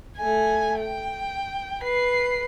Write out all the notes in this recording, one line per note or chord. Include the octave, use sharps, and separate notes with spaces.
A3 G#5
G5
B4 C7